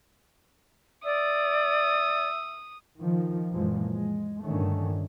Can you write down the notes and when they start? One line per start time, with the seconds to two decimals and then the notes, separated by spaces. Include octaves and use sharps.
1.05 D5 E5 D#6
2.98 D#3 F3
3.52 F#2 A#2 E3 F3 G#3
3.91 G#3
4.45 G2 A#2 D3 D#3 A3 C#4